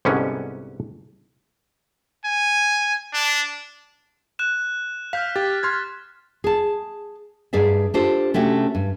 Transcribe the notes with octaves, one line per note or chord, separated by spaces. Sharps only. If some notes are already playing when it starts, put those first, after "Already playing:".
C2 G#2 D3 G3 B3 C#4
G#5
D4
F#6 E7
F5 F6 G6 B6
G4 A6
C6 F6 G#6
G#4 A5
G2 G#4 D5 E5
D4 F4 G4 A4 C5
C3 A3 C#4 D4 F#4 G4
G2